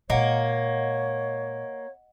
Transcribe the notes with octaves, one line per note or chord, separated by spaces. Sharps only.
A#2 G#3 A#3 C#5 D#5 F#5